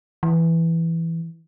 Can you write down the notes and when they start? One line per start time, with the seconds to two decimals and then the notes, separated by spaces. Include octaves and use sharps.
0.23 E3